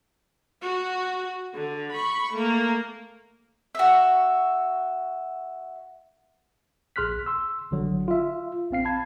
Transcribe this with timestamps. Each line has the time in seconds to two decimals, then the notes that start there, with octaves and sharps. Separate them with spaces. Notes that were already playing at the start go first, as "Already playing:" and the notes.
0.62 F#4
1.54 D3
1.92 B5 C#6
2.33 A3 A#3
3.75 F#4 E5
6.96 A#1 G#4 C6 F6 F#6 B6
7.26 C6 E6
7.71 A1 D3 F#3
8.08 F4 E5
8.71 A1 C4 F5 C7
8.85 A5 B5 G#6